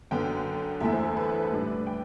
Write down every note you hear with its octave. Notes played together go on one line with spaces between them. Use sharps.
F#2 D3 F#3 B3 G5
E2 D3 A3 E4 E5
C5
A4
B4
A2 G3 D4
G5